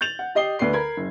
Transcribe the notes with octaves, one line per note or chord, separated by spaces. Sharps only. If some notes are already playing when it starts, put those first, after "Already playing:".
G6 A6 F7 F#7
F#5
G4 D#5 C7 G7
D2 B4 D5 C7
A#4 B5 G#6
F#1